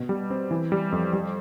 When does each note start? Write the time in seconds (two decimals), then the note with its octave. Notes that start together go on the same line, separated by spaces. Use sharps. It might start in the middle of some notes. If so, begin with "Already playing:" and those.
Already playing: B2
0.09 G3
0.30 C4
0.51 E3
0.72 G3
0.92 F2
1.13 G3